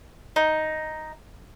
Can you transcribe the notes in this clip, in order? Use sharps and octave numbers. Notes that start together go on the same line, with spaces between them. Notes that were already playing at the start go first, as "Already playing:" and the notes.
D#4